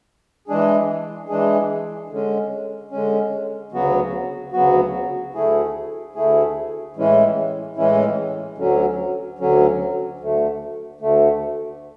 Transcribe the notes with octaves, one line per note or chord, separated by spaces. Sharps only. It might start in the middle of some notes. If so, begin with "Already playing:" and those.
E3 G#3 D4 G#4
E3 G#3 D4 G#4
D3 G#3 C#4
D3 G#3 C#4
D2 C#3 F#3 B3 F#4
D2 C#3 F#3 B3 F#4
D2 D3 A3 E4 G#4
D2 D3 A3 E4 G#4
A2 E3 G#3 C#4 E4
A2 E3 G#3 C#4 E4
D2 D3 F#3 C#4
D2 D3 F#3 C#4
D2 D3 A3
D2 D3 A3